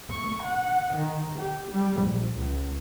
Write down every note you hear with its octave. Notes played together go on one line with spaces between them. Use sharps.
C#6
F#5
D#3
G4
G3
A#1
C#2